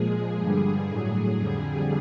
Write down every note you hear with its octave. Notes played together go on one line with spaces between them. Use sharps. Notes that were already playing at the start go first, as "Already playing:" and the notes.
Already playing: A#2 F3 G#3 G#4
G2 D3 G3
A2 F#3
F2 D3 G3